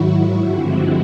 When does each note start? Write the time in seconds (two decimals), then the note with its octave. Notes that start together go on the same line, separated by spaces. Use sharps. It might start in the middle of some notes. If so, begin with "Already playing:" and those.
Already playing: G#2 D#3 F#3 E4 F#4
0.38 G2 D3 F3 G#3 C4